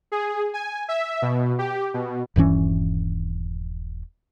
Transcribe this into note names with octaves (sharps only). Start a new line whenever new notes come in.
G#4
G#5
E5
B2
G4
B2
D#1 G2 E3 C#4